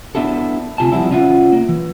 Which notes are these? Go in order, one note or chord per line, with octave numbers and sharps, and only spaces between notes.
B3 D4 E4 F#4 A4
D2 C3 F4 G#5 A5
E3 F3 G3 C4 E4 F#4
C#3 C#4 F4 E5 F#5
A#3
E3